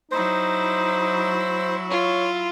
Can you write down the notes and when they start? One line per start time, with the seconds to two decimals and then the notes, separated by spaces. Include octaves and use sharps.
0.12 F#3 D#4 E4 C5
1.90 F4 C#5